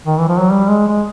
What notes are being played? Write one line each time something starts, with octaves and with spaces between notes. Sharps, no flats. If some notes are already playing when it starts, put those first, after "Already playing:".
D#3
E3
F3
F#3
G3
G#3
G#3